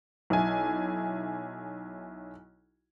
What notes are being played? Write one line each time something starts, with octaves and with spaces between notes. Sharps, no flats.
B1 E4 G#5